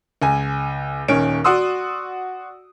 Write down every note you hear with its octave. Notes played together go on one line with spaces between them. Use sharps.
C#2 G#5
D#1 D#3 C#4 D7
F#4 D5 F#5 C6 D#6 E6